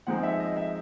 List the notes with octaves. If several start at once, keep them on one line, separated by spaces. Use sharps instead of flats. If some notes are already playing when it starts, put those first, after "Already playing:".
F3 G#3 C4 D#4 F#5
E5
D#5
E5